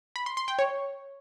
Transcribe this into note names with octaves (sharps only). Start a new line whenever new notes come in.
B5
C6
C6
G5
C#5